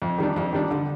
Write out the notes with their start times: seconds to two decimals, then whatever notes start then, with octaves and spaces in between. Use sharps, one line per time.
0.02 F2
0.18 D#3 G3 D4
0.36 F2
0.53 D#3 G3 D4
0.71 D3